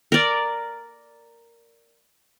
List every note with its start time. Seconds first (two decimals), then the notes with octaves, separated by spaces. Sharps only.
0.12 A#4 D5